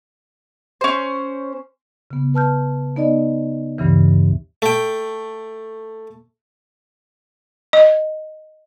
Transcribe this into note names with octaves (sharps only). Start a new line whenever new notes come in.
C#4 C5
C#3 B3
B4 A5 F6 G6
B3 D#4 D5 D#5
D2 G2 C#3 E3
A3 G5
D#5